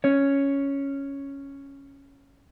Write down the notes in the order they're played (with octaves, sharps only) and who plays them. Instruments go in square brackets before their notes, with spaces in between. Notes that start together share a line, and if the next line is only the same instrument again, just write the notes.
[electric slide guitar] C#4 C#5